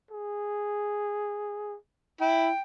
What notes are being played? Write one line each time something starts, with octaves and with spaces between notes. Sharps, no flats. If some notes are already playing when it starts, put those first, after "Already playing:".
G#4
E4 G5